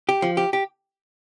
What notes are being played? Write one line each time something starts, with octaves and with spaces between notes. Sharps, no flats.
G4
F3
G4
G4